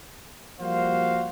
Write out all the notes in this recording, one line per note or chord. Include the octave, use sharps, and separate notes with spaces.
F3 G3 A#3 F#4 C5 F5